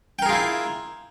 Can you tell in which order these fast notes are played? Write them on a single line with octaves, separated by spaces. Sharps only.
G5 A#4 G#4 F4 E4